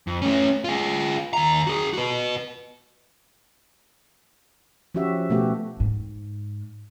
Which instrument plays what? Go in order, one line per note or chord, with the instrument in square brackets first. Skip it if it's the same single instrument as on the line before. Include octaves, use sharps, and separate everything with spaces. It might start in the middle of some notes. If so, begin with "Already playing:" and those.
[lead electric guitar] F2
A3 C#4
F4 G#4
D#2 A#5
F#4 G#4
F#4 B4
[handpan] F3 C#4 F#4 G4 E5
B2 A3 B3 F#4 G4
[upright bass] G#2